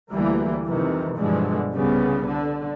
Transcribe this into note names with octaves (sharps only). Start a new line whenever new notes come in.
D2 E3 G3 A#3
F2 C3 D#3 E3
G2 B2 D3 E3 F3 G#3
C2 C#3 G3 B3
D3